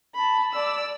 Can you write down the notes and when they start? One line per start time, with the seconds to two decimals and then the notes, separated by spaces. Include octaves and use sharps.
0.15 A5 B5
0.53 D5 E6